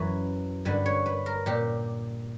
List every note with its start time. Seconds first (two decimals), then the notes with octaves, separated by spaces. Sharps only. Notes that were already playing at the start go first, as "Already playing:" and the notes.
Already playing: F#2 E3 B4
0.65 G2 D3 B4
0.86 C#5
1.06 B4
1.26 A#4
1.46 A#2 G4